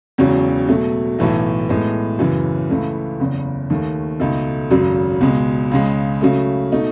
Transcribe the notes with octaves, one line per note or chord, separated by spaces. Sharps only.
E1 E2 C#3 F#3 C#4
B2 F#3 A3
B1 A2 E3 A3
A2 G#3 B3
F#1 F#2 C#3 E3
C#2 C#3 E3 A3
F#1 E2 C#3
D#2 D#3 A3
C#2 B2 A3 D#4 A4
G#1 F#2 C#3 F#3
C#2 B2 G#3
C#2 C#3 G#3
C#3 F#3 A3
B2 A3 D#4